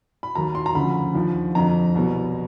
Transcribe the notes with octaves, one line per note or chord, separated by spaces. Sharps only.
B5
D#2 D#3 F#3 A#5
C6
A#5
D2 C#3 F3 B5
D#2 D3 F3
F2 D3 F3 A#5
C2 B2 F#3